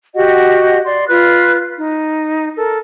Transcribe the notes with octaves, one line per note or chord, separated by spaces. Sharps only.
F#4 G4 D#5 F#5
D5 C6
F4 B4 F#6
D#4
A4 A#4